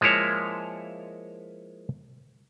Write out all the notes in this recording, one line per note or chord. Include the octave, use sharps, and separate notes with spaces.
F3 G#3 A#3 E4 C#5